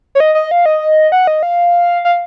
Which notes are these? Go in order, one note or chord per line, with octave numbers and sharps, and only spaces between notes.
C#5
D#5
D#5
F5
D#5
F#5
D#5
F5
F5